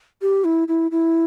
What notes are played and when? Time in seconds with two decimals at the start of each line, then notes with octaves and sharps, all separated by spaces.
0.22 G4
0.44 E4
0.68 E4
0.91 E4